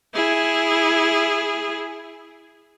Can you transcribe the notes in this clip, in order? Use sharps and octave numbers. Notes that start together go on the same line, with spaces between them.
E4 G#4